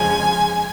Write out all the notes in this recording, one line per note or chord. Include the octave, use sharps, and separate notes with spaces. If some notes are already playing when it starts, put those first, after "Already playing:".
Already playing: F2 C#3 F3 G#3 G#5